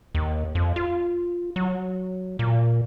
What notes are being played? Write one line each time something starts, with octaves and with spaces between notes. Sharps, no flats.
D#2
F2
F4
F#3
A#2